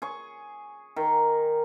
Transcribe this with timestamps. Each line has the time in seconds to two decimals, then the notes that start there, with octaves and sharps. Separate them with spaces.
0.02 G#4 C#6
0.96 D#3